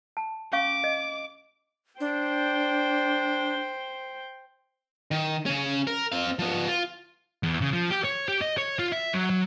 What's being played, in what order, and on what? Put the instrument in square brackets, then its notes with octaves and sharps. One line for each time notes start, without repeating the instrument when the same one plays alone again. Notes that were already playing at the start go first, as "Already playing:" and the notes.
[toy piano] A5
[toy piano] C#4 F5 C#6 [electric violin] D6
[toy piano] D#5
[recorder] D4 [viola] C5 G5
[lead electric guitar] D#3
C#3 C#4
A#4
C4 F5
F3 B3
F4
[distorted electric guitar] E2
C#3
F3
G4
C#5
G4
D#5
C#5
F4
E5
F#3
F#3